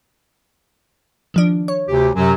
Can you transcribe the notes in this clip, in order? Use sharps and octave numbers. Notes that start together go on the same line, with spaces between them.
D#3 F3 D4
C#5
D2 C3 G4
F#2 C3 F#3